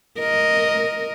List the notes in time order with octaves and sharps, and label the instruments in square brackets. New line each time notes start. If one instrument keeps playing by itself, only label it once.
[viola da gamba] A#4 D#5